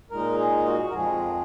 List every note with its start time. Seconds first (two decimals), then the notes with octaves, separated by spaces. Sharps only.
0.10 A#2 G#3 D#4 A#4
0.38 G#4
0.66 F#4
0.89 A#4
0.93 F2 F3 G#3 G#4